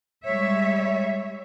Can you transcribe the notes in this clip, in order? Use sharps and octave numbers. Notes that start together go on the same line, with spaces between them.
G3 G#3 C#5 E5